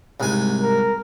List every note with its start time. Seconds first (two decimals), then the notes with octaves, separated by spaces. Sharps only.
0.20 C2 G#2 G#5
0.61 A#4